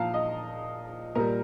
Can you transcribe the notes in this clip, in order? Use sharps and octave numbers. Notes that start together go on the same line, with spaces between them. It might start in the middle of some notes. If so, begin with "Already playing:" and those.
Already playing: A#2 F3 F5 A5 A#5
D#5
A#2 G3 A#4